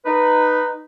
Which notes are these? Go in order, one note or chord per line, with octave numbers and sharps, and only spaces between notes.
D#4 B4